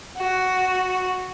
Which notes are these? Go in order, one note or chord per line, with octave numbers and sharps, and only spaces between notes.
F#4